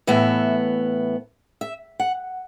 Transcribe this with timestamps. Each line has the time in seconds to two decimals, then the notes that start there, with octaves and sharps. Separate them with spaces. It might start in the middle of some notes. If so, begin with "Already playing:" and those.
0.07 A2 E3 B3 E5
1.61 E5
2.00 F#5